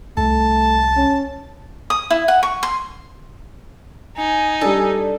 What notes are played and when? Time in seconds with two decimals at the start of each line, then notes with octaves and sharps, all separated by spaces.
0.17 C2 A3 A5
0.96 C#4
1.90 D#6
2.10 E4
2.28 F#5
2.43 C#6
2.63 C6
4.17 D#4 G#5
4.61 G3 D4 A4